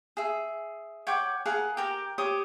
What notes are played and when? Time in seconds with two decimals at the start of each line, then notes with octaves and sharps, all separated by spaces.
0.17 G#4 E5
1.07 C#5 F#5 G5 D6
1.45 G#4 A#4 F5 F#5
1.77 G4 A#4
2.18 G4 C#5 D#6